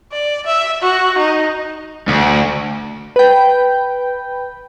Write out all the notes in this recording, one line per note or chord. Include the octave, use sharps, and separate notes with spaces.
D5
E5
F#4
D#4
D2
B4 G5